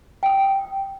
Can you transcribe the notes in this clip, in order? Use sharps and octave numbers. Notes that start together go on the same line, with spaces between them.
G5 D#6